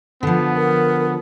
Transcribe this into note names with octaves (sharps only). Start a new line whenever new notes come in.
D3 F3 B3
A#4